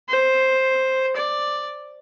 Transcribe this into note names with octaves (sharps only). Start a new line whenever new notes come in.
C5
D5